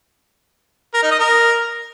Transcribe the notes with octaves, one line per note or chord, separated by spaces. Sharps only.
A#4
D#4
D#5
A#4